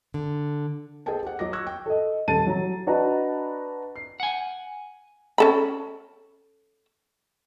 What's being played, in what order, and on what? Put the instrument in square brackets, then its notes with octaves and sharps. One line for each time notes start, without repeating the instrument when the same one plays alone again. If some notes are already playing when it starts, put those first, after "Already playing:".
[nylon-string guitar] D3
[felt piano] G#4 A4 C5 D#5 G5 A5
G4 F#5
F#3 D#5 D6 A#6
C#6 E6 F#6 G#6 A#6
G5
[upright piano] A4 D#5
D#1 A4 A5 A6 D#7
F#3 A#5
D4 F#4 B4 D#5 A5 A#5
C7
[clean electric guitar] F#5 G#5
[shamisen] C#4 A4 B5